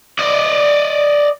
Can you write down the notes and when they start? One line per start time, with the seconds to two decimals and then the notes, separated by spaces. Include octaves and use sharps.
0.19 D5 D#5